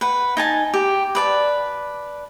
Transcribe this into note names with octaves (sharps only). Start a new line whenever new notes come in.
B4 F#5
D#4 G#5 A5
G4
B4 D5 A5